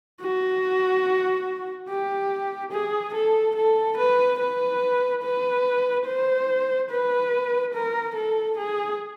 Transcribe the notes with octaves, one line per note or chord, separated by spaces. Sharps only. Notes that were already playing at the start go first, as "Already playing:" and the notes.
F#4
G4
G#4
A4
A4
B4
B4
B4
C5
B4
A#4
A4
G#4